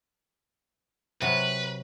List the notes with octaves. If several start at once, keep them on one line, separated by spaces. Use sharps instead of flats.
C3 F#3 B4